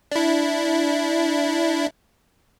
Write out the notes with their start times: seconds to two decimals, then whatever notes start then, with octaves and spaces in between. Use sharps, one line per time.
0.12 D4 E4